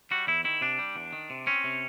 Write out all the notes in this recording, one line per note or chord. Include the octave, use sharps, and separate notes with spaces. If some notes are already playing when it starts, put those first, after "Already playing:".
G3 F#4
E2 E4
D#3 E4
C3 D4
G3
E2
D#3
C3
C4 C#4
C3